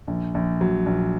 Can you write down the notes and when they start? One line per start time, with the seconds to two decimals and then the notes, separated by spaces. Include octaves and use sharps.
0.07 A#1
0.34 A#1
0.61 F#3
0.86 A#1